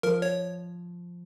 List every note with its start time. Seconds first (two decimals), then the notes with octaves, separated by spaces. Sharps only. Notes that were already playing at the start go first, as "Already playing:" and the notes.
0.03 F3 A#4
0.22 C#5